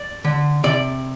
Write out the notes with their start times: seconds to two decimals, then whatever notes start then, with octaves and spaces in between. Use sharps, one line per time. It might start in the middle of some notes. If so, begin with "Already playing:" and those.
Already playing: D5
0.24 D3
0.64 C3 D5